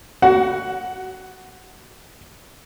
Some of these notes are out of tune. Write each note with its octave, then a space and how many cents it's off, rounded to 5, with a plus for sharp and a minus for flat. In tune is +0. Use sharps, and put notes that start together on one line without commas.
F#4 +25 F#5 +5